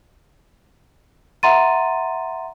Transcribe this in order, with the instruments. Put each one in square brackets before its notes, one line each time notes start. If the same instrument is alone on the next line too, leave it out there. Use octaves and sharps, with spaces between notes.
[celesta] E5 F#5 A#5 C6 A6 D#7